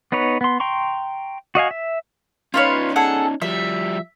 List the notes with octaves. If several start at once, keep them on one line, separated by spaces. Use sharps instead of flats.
B3 D#4 B4 C#5
B3 C6
G5 A#5 C6 C#6
F#4 D#5 F5 G#5
E5
C#4 D#4 F4 B4 C#5
G#4 A4 F#5
F3 G3 E5